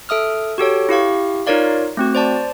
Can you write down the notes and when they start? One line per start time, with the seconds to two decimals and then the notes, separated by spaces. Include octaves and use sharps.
0.09 A4 E5 D#6 F6
0.58 F#4 G4 A4 C#5
0.89 E4 G4 F5 C#6
1.47 D#4 F4 A#4 C#5 D5 F5
1.97 A3 C4 F#4
2.15 C5 D5 A5